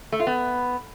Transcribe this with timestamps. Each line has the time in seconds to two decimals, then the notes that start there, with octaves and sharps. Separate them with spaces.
0.12 A3
0.20 F4
0.27 B3